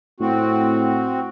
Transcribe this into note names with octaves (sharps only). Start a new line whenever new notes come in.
A2 C4 F#4